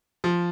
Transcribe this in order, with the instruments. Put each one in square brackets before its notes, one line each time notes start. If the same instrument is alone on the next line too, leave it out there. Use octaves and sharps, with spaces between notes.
[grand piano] F3